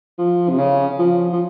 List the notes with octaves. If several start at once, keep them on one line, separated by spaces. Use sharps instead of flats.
F3
C3
C#3
F3
F3